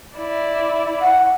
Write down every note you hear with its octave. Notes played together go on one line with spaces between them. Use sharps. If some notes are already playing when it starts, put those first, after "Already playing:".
E4 D5
F#5